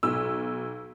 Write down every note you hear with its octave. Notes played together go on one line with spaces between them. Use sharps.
B1 E6